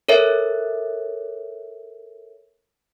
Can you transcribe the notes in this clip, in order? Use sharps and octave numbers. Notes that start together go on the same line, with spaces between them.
A4 A#4 C#5 E5